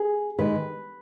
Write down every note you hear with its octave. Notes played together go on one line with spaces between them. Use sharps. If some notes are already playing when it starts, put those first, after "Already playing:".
Already playing: G#4
D#3 G#3 B4